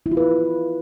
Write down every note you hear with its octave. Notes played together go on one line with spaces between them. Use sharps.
E4
F4
B4